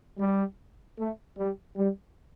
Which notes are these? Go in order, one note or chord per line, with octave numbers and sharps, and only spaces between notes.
G3
A3
G3
G3